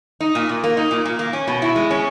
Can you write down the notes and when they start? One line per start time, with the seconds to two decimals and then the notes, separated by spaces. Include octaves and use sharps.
0.21 D#4
0.35 A#2
0.49 A#2
0.64 A#3
0.77 D#4
0.91 A#2
1.05 A#2
1.19 A#3
1.33 C#4
1.47 B2
1.62 E4
1.76 G#3
1.91 C#4